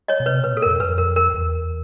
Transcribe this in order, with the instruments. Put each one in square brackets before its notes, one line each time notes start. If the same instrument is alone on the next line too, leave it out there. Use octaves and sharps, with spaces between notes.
[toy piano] C#5 D#5
[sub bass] B2
[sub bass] C3 [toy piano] B4 C#5
[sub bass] B2 [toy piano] B4
[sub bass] A#2 [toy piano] A4
[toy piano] A#4
[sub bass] F2
[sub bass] F2 [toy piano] B4
[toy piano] A#4
A#4
[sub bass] E2